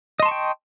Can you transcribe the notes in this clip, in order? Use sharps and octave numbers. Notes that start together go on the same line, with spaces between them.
D#5 G5 A5 C6 C#6